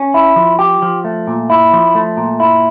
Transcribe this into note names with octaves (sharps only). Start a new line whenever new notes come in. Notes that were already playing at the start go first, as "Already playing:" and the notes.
Already playing: C#4
E4
F3
G4
F3
A3
A#2
E4
F3
A3
A#2
E4